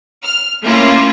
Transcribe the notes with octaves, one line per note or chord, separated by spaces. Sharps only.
F6
A3 A#3 C#4 E4 F4